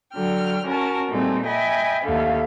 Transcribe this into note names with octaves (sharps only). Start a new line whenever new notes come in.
D3 F#3 G5 F6
C#4 F#4 A#4 A5
A#2 G3 A3 C4 D#4 G#4
D#5 E5 G5 G#5 B5
D#2 D3 A3 E5 F5